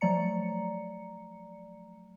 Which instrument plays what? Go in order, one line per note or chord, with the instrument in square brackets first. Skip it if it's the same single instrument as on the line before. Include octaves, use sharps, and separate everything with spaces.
[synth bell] F3 F#3 A3 D5 A#5 C#7